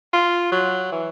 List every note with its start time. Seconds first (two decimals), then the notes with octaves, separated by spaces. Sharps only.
0.13 F4
0.52 F#3
0.92 E3